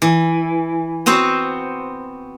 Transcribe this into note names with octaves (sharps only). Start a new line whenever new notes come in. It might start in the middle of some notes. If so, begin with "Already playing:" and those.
E3
B3 C4 F#4 C5